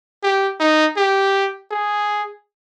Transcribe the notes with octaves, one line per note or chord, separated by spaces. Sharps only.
G4
D#4
G4
G#4